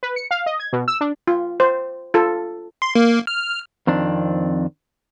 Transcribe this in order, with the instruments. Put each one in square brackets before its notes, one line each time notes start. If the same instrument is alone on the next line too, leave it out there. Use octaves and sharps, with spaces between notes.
[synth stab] B4
C#7
F5
D#5
G#6
B2
E6
D4
[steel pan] F4
C5
F4 A4
[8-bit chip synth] C6
A#3
F6
[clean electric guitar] F2 D#3 C4 D4